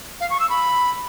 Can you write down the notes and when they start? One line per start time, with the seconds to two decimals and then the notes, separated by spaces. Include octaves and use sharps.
0.21 F5
0.30 C#6
0.40 E6
0.50 B5